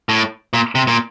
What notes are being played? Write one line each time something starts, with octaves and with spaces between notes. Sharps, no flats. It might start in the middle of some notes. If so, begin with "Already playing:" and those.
A2
A#2
C3
A#2